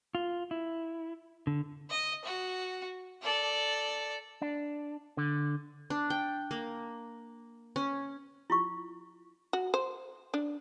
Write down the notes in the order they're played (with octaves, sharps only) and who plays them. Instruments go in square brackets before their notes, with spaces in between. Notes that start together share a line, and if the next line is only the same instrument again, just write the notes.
[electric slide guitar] F4
E4
D3
[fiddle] D#5
F#4
A4 D5
[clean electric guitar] D4
D3
[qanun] D4
G5
A#3
C#4
[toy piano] E4 F4 C#6
[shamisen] F#4
C5
D4